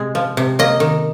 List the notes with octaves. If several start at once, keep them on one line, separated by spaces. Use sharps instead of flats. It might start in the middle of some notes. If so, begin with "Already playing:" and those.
Already playing: C3 G#3
F3
C3
A#3 D#5
D#3